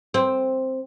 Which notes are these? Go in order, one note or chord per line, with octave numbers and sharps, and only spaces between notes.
C4